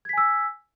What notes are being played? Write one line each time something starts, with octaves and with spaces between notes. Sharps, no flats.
G#5 E6 G#6 B6